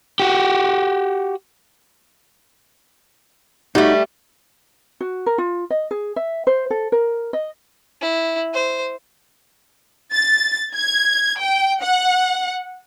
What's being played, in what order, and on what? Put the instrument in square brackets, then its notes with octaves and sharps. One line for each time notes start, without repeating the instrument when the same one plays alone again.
[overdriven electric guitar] F#4 G4
[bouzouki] G3 A3 [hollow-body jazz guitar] D#4 F#4
[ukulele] F#4
A#4
F4
D#5
G#4
E5
C5
A4
A#4
D#5
[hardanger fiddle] E4
C5
[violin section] A6
G#6
G5
F#5